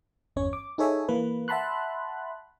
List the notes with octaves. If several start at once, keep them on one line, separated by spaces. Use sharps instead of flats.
G1 E2 C#4 C#5
D6
D#4 G#4 A4 C#5 E5 G#5
E3 A#3 B4
E5 F#5 A5 B5 C6 F#6